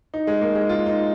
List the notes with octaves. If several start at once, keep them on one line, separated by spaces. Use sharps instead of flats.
D#4
G#3
A#3
G#3
F4
D#4